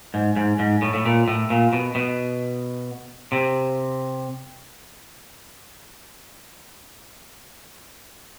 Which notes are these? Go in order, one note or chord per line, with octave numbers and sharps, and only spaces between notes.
G#2
G#2
G#2
A2
A2
A#2
A2
A#2
B2
B2
C3